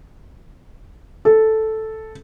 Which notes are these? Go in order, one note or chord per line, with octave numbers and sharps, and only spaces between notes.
A4